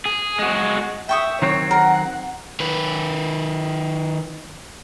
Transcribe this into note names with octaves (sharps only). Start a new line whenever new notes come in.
G#4
G#3 F#4
E5 G5 C#6 D#6
D#3 F#3 C4 C#5
A#4 F#5
D#3 B4